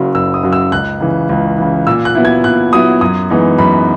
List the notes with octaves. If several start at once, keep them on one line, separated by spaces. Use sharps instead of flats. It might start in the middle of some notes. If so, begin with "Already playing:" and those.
Already playing: F#1 F#2 C#3 F#3
F#1 E6
D#6
F#2 C#3 F#3
E6
C#2 F#6
C#3 E3
C#2
C#3 E3
A#2 E6
F#6
F#3 B3 E4
G#6
A#2 F#6
F#3 B3 E4 D#6
F#2 D#6
E3 G#3 B3 D#4
F#2 B5